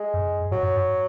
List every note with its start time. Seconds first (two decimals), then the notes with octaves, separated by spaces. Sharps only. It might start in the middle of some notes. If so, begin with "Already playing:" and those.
Already playing: G#3
0.14 F#2
0.51 G#2 F#3
0.63 F#2
0.74 G#2